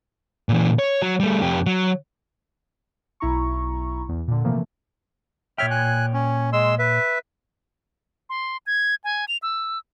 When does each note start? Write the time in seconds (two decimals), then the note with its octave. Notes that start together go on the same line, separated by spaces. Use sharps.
0.49 A#2 E3
0.79 C#5
1.02 F#3
1.20 G3 A3
1.42 F2 G4
1.67 F#3
3.20 B1 E4 A#5 C#6
4.09 E2
4.28 A#2 D3
4.44 C3 E3 F3 A3 A#3
5.58 A#2 C#5 E5 G5 F6
5.71 G#5 F#6
6.14 C#4
6.53 G#3 C6 E6
6.79 B4 E5
8.30 C6
8.67 G#6
9.04 G#5
9.28 F7
9.42 E6